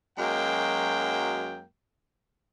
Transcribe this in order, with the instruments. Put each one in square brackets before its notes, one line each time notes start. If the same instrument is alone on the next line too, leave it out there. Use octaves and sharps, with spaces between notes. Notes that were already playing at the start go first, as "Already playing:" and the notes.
[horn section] F#2 F#3 G#3 A#3 G5